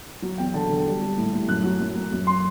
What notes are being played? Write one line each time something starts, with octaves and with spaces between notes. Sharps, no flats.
F#3
E2 G5
D3 A5
D3
G3
G3
A2
A2
F#2 F#6
F#3
F#2
F#3
F#2
C6